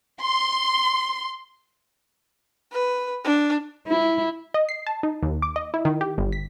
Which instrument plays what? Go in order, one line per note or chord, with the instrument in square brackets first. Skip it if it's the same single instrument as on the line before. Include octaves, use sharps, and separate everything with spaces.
[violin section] C6
[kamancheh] B4
D4
[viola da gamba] E4
[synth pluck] D#5
C7
A5
D#4
D#2
D6
D#5
E4
D#3
G4
G1
B6